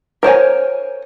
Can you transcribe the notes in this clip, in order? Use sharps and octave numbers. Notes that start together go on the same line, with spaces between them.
A#4 C5 C#5 G#5